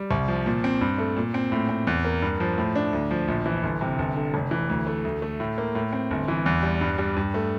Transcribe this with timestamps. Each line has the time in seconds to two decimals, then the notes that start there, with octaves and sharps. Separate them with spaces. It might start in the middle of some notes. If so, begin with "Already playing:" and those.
Already playing: G3
0.11 C2
0.28 F3
0.46 A#2
0.64 C4
0.81 G2
0.98 A3
1.17 A#2
1.34 C4
1.52 A2
1.69 C4
1.87 E2
2.05 A#3
2.22 G2
2.40 F3
2.58 A2
2.75 D4
2.93 D2
3.11 F3
3.28 A#1
3.46 E3
3.63 G1
3.81 C3
3.98 G1
4.16 D3
4.34 F1
4.51 E3
4.69 D2
4.87 A3
5.05 D2
5.22 A3
5.40 A2
5.58 A#3
5.75 A2
5.93 C4
6.11 G1
6.28 E3
6.46 E2
6.63 G3
6.81 G2
6.98 G3
7.16 G2
7.34 A3